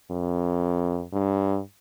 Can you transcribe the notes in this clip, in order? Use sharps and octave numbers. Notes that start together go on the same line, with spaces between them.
F2
G2